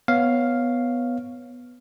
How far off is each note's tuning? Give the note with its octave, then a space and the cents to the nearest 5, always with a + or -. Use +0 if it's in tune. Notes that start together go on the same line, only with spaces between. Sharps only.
B3 +0 C#5 +0 F5 +0